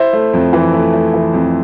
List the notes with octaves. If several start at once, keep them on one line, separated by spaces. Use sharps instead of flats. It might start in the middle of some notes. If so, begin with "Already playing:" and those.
Already playing: E4 C5 E5
A3
F2
E3
A3
A3
E3
F2